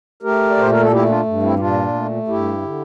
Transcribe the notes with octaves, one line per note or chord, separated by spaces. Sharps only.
A3 G4 A#4
D5
A#2 C5
A#4
A4
A3 E4 G4
D4 F4
G2
C4 E4
G4
A#2 D4 F4
A3
G2 E4 G4
D3